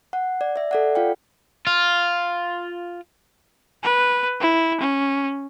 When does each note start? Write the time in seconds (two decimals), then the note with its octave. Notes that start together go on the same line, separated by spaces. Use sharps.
0.13 F#5
0.41 D5
0.56 D5 E5
0.71 A4 D5 F#5
0.95 F4 F5 G5
1.67 F4
3.83 B4
4.41 E4
4.80 C#4